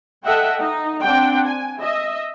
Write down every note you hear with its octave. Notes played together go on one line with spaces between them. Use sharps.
A4 D#5 E5 F#5 G5
D#4
C4 D4 F#5 G5
G#5
D#5 E5